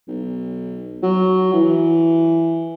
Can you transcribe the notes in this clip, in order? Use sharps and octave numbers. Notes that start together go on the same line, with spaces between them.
B1
F#3
E3